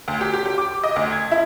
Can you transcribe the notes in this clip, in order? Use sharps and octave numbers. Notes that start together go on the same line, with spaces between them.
D2
G4
G4
G4
D6
D#5
D2
G#6
E4